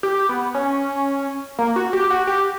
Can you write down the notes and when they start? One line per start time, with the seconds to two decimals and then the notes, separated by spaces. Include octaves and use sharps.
0.03 G4
0.29 B3
0.55 C#4
1.59 A#3
1.76 F#4
1.93 G4
2.10 F#4
2.27 G4